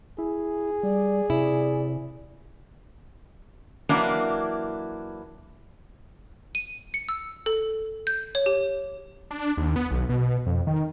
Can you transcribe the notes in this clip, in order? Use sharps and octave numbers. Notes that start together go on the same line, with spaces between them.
E4 G#4
G3 D5
C3 E4 D5
E3 F#3 A#3 D4 E4
D#7
C#7
E6
A4
G6
C#5
G4
D4
D#2
B3
B1
B2
F2
D#3